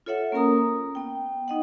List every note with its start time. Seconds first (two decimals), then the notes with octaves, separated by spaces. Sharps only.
0.06 F4 A4 C#5 E5 F#5
0.32 A#3 C#4 A#4 A#5 D#6
0.95 B3 G5
1.48 D#4 D#5 F#5